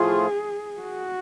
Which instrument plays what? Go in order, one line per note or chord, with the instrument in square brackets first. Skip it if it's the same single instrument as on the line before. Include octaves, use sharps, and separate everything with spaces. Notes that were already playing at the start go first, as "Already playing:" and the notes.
Already playing: [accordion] A2 F3 A3 F4 [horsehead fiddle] G#4
[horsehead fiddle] F#4